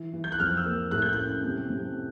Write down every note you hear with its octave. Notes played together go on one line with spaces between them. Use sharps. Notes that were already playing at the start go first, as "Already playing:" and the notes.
Already playing: E3
E3
G6
F#6
F2 F6
E6
A#3
A2 F#6
G6
F#6
C#4
C3
C3